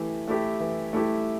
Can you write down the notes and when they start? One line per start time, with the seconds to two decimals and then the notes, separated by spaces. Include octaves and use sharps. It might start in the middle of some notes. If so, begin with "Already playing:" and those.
Already playing: E3 A3 E4 G4
0.28 A3 E4 G4
0.60 E3
0.93 A3 E4 G4